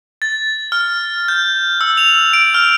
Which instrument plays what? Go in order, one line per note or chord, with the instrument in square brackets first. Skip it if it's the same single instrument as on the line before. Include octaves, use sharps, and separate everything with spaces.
[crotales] A6
F6
G6
E6
F7
D7
F6